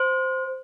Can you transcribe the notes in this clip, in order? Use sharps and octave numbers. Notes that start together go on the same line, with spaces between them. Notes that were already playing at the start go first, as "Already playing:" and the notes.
Already playing: C5